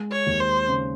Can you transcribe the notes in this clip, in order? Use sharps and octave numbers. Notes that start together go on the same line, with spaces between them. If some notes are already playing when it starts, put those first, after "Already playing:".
Already playing: G#3
C#5
D#2
C5
C#3